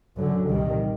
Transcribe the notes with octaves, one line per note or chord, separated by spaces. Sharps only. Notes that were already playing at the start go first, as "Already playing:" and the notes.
F#2 D3 F#3
C2 A#2 D#3 G3